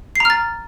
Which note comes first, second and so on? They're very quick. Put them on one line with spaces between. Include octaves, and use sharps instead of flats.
C7 A#5 F6 A6